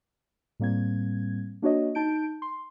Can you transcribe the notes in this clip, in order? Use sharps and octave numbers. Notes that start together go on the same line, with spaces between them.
A2 G3 A#3 C4 G#6
A#3 D4 F#4 C#5 D#5
D#4 A5 G6 D7
C6